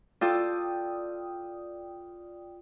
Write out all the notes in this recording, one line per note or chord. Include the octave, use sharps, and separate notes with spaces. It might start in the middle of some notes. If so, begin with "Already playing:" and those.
F4 A4 D5 G5 D#6